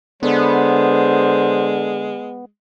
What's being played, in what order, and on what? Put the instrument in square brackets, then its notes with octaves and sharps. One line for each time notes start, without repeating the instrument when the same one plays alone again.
[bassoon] D3 [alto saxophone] G#3 [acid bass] B3 [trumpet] C5